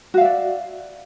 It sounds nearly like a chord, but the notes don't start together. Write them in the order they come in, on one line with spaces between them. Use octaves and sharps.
F#4 F5 E5 D5